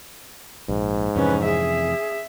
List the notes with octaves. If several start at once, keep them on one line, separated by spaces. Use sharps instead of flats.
A#1 G#2
F2 C3 E3 C#4 B4
G#4 E5